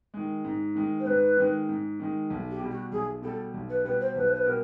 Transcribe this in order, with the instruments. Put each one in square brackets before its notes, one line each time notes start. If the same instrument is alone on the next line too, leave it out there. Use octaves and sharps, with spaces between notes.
[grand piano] D#3 G#3
G#2
D#3 G#3
[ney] C5
[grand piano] G#2 [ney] B4
[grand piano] D#3 G#3
G#2
D#3 G#3
B1
[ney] G4
[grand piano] B2
G3
[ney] F#4
[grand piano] B1 [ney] G#4
[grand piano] B2 G3 [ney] A4
[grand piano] B1
[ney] B4
[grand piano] B2 G3 [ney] B4
[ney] C5
[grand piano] B1 [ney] B4
[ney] C5
B4
[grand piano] B2 G3 [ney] A#4